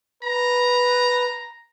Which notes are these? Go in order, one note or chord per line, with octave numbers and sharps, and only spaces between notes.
B4 A#5